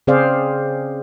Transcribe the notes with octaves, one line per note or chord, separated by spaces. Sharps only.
C#3 C4 G#4 C5 D5 F5